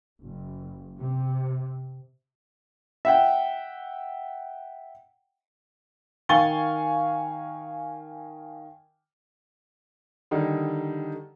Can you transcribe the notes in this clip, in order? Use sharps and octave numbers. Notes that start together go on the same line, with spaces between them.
F#1
C3
E5 F#5 G5
D#3 F5 G#5 C#6 A6 G7
D3 D#3 G3 D#4